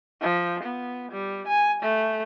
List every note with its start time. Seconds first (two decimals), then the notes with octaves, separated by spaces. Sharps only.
0.22 F3
0.63 B3
1.12 G3
1.47 G#5
1.83 A3